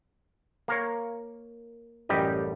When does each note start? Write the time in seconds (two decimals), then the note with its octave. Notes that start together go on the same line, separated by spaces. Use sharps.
0.68 A#3 A#4 C#5
2.09 A1 F#2 G3 G4 D#5